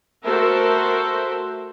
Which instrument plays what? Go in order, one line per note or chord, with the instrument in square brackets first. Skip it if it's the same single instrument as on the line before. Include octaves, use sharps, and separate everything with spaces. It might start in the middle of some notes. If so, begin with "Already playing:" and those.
[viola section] A3 F#4 A4 A#4 C5 E5